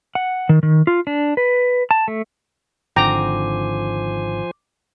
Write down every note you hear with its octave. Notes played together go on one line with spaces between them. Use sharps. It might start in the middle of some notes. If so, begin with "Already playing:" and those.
F#5
D#3
D#3
F4
D4
B4
A5
A3
G#1 D3 F3 C5 G5 G#5 A#5 D6